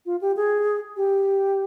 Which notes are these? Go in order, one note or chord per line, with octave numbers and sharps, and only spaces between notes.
F4
G4
G#4
G4